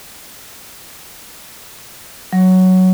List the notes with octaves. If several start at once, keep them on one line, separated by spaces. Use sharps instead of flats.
F#3